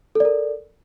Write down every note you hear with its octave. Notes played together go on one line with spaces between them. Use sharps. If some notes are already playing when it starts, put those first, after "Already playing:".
A4 A#4 D5